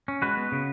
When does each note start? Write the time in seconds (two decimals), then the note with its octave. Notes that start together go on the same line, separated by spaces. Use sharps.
0.08 C#4
0.22 G#3 F#4 B4
0.37 B3
0.52 C#3